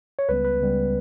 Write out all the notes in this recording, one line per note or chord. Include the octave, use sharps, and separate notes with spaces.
C#5
C#2 C#3 G3 B3 B4
B4
C#2 C#3 G3 B3